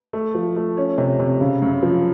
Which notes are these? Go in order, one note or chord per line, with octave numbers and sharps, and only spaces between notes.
A3
F3
A3
C#4
C3
C3
C#3
F#2
F3